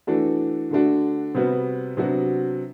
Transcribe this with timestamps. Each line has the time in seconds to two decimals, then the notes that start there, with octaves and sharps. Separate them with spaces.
0.07 E3 A3 D4 F#4
0.71 D3 A3 D4 F#4
1.35 C3 G3 B3 F#4
1.97 C3 F#3 B3 D4 F#4